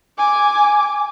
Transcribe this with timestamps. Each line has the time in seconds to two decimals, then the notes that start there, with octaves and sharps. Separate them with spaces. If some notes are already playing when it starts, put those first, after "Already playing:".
0.18 G#5 D6